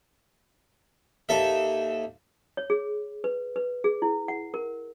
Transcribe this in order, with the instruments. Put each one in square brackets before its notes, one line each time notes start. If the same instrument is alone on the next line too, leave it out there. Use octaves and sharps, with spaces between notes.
[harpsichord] D#2 A4 E5
[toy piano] C#5
G#4
B4
B4
G#4
E4
F#5
A#4